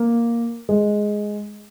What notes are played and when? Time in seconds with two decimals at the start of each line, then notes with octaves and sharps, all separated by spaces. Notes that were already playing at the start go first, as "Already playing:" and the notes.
Already playing: A#3
0.69 G#3